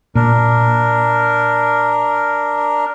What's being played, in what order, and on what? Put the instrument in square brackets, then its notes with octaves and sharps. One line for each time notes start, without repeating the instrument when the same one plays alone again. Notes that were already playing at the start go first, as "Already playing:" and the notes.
[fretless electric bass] A#2 [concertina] D4 A#4